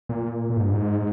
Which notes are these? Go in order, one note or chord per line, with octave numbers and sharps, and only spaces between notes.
A#2
A#2
G#2
G2
G#2